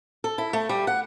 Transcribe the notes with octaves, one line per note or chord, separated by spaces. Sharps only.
A4
E4
A3
G3
F#5